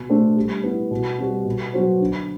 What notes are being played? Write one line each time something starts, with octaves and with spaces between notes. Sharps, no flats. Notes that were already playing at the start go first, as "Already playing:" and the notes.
Already playing: B2
A3 D4 A4 C5
G3
B3 E4
B2
G3 C4 F#4
B2
F#3 B3 F#4 C5
D3